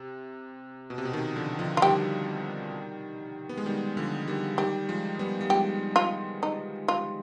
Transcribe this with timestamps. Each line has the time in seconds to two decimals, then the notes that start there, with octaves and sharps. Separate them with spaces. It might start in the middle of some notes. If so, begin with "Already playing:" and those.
Already playing: C3
0.90 B2
0.98 C3
1.05 B2
1.13 C3 D#3
1.36 D3 F3
1.59 D3 F3
1.77 F4
1.82 D#3 G3 G4
3.49 B3
3.57 G#3
3.66 D#3 G3
3.97 D3 F3
4.28 D#3 G3
4.58 D#3 G3 G4
4.89 F3 G#3
5.19 G3 B3
5.41 G3
5.50 F3 G#3 G4
5.96 F4
6.43 D#4
6.88 F4